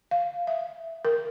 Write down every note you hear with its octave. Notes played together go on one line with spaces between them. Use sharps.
F5
E5
A#4